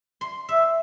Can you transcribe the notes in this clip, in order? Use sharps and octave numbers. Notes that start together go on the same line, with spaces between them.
C6
E5